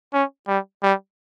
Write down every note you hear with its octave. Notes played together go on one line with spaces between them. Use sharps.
C#4
G3
G3